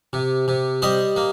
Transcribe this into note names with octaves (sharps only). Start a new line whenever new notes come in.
C3
C3
G3 C5 D#5
A#3